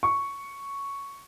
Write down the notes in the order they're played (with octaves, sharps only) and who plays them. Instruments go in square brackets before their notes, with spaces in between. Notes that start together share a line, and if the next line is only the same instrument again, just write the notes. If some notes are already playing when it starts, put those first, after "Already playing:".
[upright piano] C#6